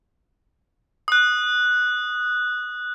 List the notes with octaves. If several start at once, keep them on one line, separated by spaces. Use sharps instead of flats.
D#6 F#6